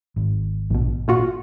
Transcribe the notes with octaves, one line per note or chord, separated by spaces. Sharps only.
G#1
A#1 B2
A#2 F4 F#4